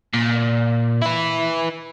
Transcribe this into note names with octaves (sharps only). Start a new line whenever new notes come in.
A#2
E4 B4